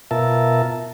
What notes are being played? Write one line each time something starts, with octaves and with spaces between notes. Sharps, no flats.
B2 F4 A#4 E5 A5